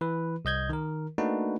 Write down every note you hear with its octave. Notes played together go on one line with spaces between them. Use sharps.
E3 B4
C2 D#5 G6 G#6
D#3 A#4
A3 A#3 D4 D#4 F#4 B4